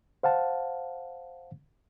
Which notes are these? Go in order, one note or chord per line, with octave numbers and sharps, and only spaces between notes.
C5 F5 F#5 A5